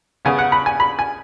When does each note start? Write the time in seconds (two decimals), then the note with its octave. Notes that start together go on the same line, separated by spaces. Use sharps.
0.25 C#3 B3 G#5
0.38 F#5
0.52 B5
0.66 G#5
0.80 B5
0.99 G#5